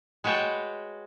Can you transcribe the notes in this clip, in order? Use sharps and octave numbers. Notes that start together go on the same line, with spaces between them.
G#3 F#4 B4 C#5 G5 A5